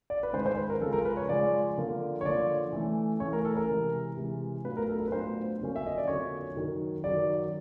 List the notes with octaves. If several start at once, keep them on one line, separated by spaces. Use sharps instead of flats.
D5
B4
G#2 D#3 G#3 C#4 C5
C5
B4
A#4
C#3 F3 G#3 C#4 A4
A#4
B4
C#5
C#3 F3 G#3 C#4 D5
D3 F3 A#3
C#5
D3 F3 A#3 D5
E3 A3 C#4
E3 A3 C#4 C#5
A#4
A4
A#4
C3 E3 G#3
C3 E3 G#3
A2 F#3 B3 D4 F4 B4
A#4
A4
A#4
B4
A2 F#3 B3 D4 F4 C5
F2 D3 F#3 A#3 C#4
E5
D#5
D5
F2 D3 F#3 A#3 C#4 C#5
F#2 D#3 F#3
F#2 D#3 F#3 D5